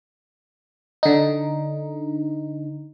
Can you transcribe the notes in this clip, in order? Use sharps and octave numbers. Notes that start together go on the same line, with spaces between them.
D3 D#4